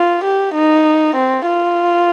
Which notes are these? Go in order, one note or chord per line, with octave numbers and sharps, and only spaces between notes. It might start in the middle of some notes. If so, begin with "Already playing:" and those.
Already playing: F4
G4
D#4
C4
F4